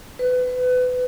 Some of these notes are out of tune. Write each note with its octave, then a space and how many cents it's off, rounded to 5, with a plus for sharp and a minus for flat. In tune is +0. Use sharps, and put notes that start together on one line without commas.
B4 +25